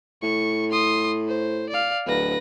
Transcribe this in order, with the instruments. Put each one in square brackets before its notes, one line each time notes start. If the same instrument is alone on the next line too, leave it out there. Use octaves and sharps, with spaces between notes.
[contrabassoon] A2 [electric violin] C#6
[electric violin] C6 D#6
C5
D5 F5
[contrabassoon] D1 [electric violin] B4 A#6